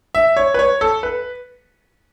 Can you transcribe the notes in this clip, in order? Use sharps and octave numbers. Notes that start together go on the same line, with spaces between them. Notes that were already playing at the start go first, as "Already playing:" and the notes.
E5
C#5
B4
C#5
A4
B4